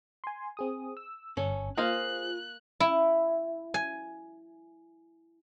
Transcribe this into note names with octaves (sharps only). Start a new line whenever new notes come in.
G#5 C6
C4 G#4 D#6
E6
G1 C#4 A4
A#3 F4 G#4 C5 F5 F#6
E4
G#5